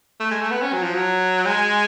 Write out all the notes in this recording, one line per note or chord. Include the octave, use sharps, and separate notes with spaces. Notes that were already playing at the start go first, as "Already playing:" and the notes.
A3
G#3
A3
B3
C#4
F#3
F3
F#3
G#3